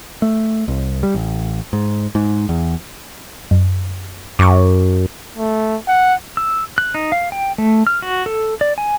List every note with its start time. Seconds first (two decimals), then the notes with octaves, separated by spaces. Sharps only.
0.22 A3
0.68 C2
1.03 G3
1.15 A1
1.73 G#2
2.15 G#2
2.49 E2
3.51 F#2
4.39 F#2 C#6 D6
5.37 A3
5.88 F#5
6.37 E6
6.78 F#6
6.95 D#4
7.12 F5
7.32 G5
7.58 A3
7.87 F6
8.02 F#4
8.26 A4
8.61 D5
8.78 G#5